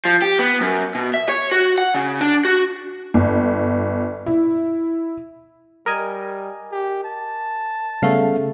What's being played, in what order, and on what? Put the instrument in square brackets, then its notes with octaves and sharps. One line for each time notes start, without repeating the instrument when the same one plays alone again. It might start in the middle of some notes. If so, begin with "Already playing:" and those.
[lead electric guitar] F3
G4
B3
F#2
B2
E5
C#5
F#4
F#5
C#3
D4
F#4
[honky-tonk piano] G1
E4
[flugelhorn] G3 [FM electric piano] A#4 D#5 G#5
[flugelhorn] G4
A5
[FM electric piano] C#3 A3 [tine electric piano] G3 B3 F5